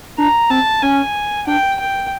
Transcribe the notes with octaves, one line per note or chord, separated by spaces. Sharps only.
D4 A#5
C4 A5
C#4 G#5
D4 G5
G5